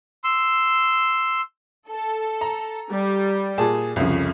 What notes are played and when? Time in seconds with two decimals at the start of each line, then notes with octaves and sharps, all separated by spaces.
0.24 C6 E6
1.89 A4
2.41 A#5
2.90 G3
3.58 A#2 G#4 A5
3.96 C2 F2 C#3